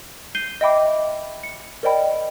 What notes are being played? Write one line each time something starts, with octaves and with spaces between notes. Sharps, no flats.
G6 C7 D#7 G7
D#5 E5 G5 B5 D6
C#7
A#4 C5 D5 D#5 G5 B5